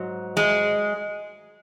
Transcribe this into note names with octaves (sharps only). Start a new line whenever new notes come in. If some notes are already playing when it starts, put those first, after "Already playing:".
Already playing: G#2 F#3
G#3